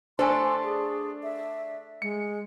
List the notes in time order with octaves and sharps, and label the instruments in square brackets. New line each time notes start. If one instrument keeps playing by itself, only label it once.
[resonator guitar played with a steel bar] A3 A4 [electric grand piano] D4 [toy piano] C5 G#5 [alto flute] C6
[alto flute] G#4
E5
[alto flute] G#3 [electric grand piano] C#7